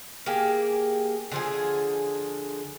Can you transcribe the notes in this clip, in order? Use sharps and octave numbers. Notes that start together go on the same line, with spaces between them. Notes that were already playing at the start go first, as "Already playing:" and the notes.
A#3 G4 G#4
D3 F3 G#4